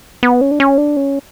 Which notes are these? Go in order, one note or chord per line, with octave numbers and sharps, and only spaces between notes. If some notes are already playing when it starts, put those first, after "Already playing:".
B3
C#4
D4
C#4
D4
C#4